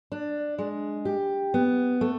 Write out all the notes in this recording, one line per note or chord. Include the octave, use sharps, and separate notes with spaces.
D4
G#3
G4
B3
A3